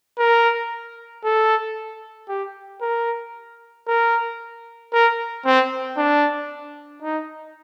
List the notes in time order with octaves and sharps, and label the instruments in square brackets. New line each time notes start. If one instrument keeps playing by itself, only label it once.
[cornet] A#4
A4
G4
A#4
A#4
A#4
C4
D4
D#4